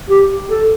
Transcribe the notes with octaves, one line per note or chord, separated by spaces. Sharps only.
G4
A4